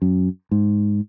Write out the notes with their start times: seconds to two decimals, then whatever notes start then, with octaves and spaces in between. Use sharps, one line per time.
0.02 F#2
0.51 G#2